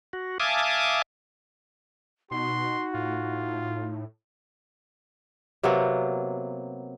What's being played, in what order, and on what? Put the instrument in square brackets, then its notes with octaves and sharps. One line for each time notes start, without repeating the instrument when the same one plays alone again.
[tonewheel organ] F#4
E5 F5 G#5 A5 D6 D#6
[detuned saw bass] B2 [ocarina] D#4 [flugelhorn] F#4 [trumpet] C6
[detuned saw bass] A2 [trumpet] F4
[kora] C3 F#3 A#3 B3